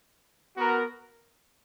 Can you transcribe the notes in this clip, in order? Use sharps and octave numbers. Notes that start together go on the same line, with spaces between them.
B3 F#4 A#4